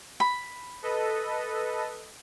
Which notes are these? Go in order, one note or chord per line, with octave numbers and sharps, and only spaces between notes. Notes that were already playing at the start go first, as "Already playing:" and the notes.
B5
A4 B4 D#5